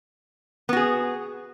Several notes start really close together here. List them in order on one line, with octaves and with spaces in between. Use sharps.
B3 F#4 G#4